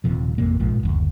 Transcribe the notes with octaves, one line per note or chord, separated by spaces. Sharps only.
D#1 D#2 C3 F3
A1 F2 C3 A#3
A#1 G#2 F3
F#1 D2